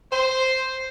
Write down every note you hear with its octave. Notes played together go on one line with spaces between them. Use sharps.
C5